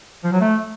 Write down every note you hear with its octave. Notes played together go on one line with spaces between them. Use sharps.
F3
F#3
A3